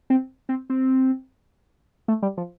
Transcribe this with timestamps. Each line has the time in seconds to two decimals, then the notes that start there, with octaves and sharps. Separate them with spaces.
0.10 C4
0.49 C4
0.70 C4
2.08 A3
2.22 G3
2.37 F3